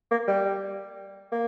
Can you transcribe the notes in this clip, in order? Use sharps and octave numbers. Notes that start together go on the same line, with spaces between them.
A#3
G3
A#3